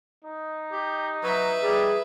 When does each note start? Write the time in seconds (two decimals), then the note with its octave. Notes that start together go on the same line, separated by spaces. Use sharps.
0.24 D#4
0.72 G4
1.23 F#3 B4 E5
1.63 G3 G#4